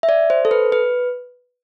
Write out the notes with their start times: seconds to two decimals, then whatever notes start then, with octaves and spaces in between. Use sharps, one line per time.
0.03 E5
0.09 D5
0.30 C5
0.45 A4
0.51 B4
0.72 B4